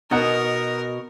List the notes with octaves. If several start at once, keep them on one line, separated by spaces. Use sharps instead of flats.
B2 D#4 A#4 F#5